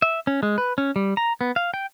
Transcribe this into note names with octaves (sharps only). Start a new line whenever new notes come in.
E5
C#4
G#3
B4
C#4
G3
A#5
B3
F5
G5